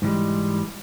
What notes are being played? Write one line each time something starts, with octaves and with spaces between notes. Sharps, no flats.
G#2 E3 G3 G#3